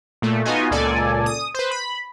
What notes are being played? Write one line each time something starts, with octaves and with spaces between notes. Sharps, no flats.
A#2 A3
B3 D#4 F4 F#4 D#5 G#5
C#2 A#2 A4 D5 G#5
D#6
B4 C5
B5